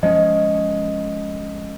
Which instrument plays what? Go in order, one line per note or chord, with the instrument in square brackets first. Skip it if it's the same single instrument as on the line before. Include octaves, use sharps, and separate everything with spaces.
[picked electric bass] F3 G#3 C#4 [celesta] D#5